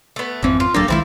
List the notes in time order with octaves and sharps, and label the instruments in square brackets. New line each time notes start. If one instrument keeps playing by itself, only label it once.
[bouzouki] A3 B3
[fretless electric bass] G#1 F2 C4 [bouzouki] E3 F3
[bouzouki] F4
[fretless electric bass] D1 F#3 D4 [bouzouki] A#3 G4 A4
[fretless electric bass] B1 D#3 G#3 [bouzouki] C4 E4 F4